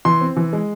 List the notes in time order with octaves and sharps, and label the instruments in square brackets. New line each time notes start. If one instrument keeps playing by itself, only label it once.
[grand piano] E3 C6
C4
E3
G#3